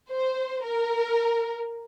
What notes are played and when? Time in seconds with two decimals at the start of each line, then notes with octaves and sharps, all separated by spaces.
0.10 C5
0.65 A#4